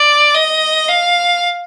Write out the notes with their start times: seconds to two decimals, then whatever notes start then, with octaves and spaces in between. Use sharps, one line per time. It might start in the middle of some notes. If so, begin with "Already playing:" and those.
Already playing: D5
0.35 D#5
0.89 F5